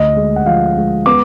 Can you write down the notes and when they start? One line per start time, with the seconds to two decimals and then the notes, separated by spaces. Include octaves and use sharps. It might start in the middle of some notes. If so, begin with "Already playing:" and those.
Already playing: D2 D#5
0.16 G#3
0.36 F#5
0.46 F3 F5
0.77 G#3
1.06 B3 D6